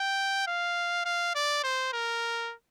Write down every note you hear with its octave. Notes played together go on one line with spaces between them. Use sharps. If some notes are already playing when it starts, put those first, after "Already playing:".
Already playing: G5
F5
F5
D5
C5
A#4